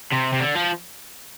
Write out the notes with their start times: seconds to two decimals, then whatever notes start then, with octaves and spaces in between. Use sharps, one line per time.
0.12 C3
0.33 C3
0.41 D3
0.56 F3